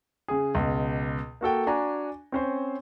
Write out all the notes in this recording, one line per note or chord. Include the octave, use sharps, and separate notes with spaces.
C#3 G#4
C#2 B2
A#3 F#4 A4 G5
D4 F#4 G#5 A#5
C4 C#4 C5